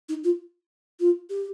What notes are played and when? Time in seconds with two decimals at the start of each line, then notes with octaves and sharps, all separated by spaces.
0.09 D#4
0.24 F4
1.00 F4
1.30 G4